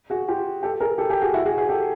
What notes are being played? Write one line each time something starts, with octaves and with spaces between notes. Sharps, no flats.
F#4 G#4
F4 G4
G4 A4
G#4 A#4
G4 A4
G4 A4
F#4 G#4
E4 F#4
F#4 G#4
F#4 G#4
G4 A4